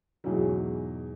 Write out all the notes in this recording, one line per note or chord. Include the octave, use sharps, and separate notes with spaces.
E2 G#2 B2 E3 F#3